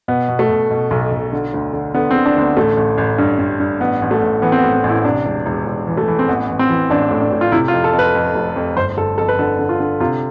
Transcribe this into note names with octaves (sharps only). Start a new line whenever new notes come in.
B2 B3
B2
A3
B2
B2
B1
B1
D3
D2
D3
D3 B3
C4
D3
D4
D2 B3
A1 A3
A1
A1
G2
G2
G2
A1 B3
A1
A3
A1
E3 B3
C4
B3
A2
C4
A1
E4
C3 D4
E1
E1
E1
E3
A3
E3
C4
A1 B3
A1
C4
E3
A1 D4
A2
D4
A2
F4
C3 E4
F4
F2
A4
F2
B4
F2
F1
F2
G1 C5
G1 A4
F2 A4
B4
D3 A4
D3
F4
D3
C3 F4